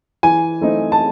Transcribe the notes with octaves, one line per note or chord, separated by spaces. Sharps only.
E3 G#5
A3 C4 D#4
A5